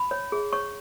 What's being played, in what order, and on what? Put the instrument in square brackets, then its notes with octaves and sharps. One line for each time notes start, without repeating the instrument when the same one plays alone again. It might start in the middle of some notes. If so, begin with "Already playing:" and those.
Already playing: [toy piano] B5
C#5
G#4
C#5 C#6